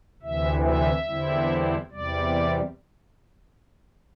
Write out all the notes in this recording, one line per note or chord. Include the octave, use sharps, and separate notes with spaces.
D2 C3 E3 E5
E5
E2 D3 G3 C4 E4
E2 C3 G3 D5